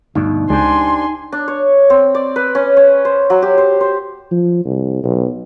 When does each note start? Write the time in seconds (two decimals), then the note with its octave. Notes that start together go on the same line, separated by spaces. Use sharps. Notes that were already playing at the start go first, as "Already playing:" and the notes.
0.15 D2 G2 B2 D#4
0.50 C#2 D4 G4 C5 G#5 C6
1.32 D4
1.48 C#5
1.90 C4
2.15 D5
2.36 B4
2.55 C#4
2.77 C#4
3.05 C5
3.30 F#3
3.42 G4
3.58 C5
3.81 C5
4.31 F3
4.65 C2
5.04 B1